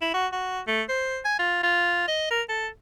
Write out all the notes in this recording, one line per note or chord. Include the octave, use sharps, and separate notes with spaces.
E4
F#4
F#4
A3
C5
G#5
F4
F4
D#5
A#4
A4